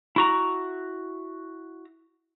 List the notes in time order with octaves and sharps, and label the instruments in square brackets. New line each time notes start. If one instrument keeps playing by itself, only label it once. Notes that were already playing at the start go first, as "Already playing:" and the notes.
[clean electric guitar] E4 F#4 A#5